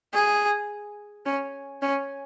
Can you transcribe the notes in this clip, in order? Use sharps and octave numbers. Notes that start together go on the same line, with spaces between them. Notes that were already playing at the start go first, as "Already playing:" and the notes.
G#4
C#4
C#4